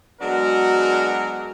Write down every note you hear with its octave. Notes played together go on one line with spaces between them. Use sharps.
F#3 G#3 B3 D4 F#4 A#4